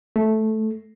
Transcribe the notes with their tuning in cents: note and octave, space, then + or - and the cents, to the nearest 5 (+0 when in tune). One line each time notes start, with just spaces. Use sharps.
A3 -10